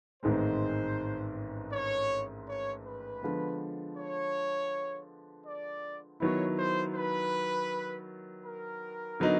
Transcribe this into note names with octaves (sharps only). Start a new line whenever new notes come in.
A1 G#2 D#3 G#3 C4 C5
C#5
C#5
B4
D3 F3 G#3 B3
C#5
D5
D#3 F#3 B3 E4 C#5
C5
B4
A#4
D3 F#3 B3 D#4